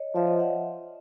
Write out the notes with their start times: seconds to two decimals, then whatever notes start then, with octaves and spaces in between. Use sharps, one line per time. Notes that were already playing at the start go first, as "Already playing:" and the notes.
Already playing: C#5 D#5
0.15 F3 D5 E5
0.27 D#5 F5
0.40 E5 F#5